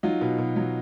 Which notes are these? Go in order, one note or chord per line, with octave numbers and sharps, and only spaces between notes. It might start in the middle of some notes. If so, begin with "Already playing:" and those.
F#3 D#4 F4
B2
B2
F#3